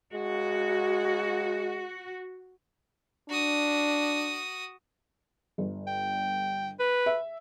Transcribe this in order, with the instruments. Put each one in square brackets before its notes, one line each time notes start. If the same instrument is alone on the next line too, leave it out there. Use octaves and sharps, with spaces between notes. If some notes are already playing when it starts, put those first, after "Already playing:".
[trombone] G#3 [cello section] F#4
[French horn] D4 [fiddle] F#4 D#6
[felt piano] G1
[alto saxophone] G5
B4
[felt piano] E5